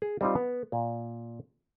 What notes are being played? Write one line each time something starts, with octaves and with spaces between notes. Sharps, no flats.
G#4
G3 C4 D#4 F4
B3
A#2